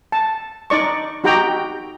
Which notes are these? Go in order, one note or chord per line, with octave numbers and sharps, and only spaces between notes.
A5
D#4 D5 C#6
D#4 F#4 G4 G5 A#5